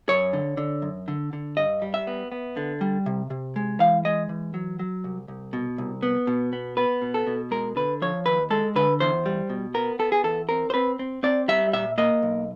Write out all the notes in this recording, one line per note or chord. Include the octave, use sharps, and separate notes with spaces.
F#2 C#5
D3
D3
F#2
D3
D3
G2 D#5
G3
E5
B3
B3
D3
G3
C3
C3
G#3
E3 F5
G#3 D#5
E3
F#3
F#3
C2
C2
B2
C2
B3
B2
B3
B3 B4
B2
A4
B2
G#3 A#4
D3 B4
F3 C#5
D#2 B4
G#3 A4
D3 B4
E2 C5
G3
B2
B3 A#4
B3 A4
G#4
E2 A4
C4 A#4
C5
C4 B4
C4
C4 D5
G3 E5
A#2 E5
A#3 D#5
B1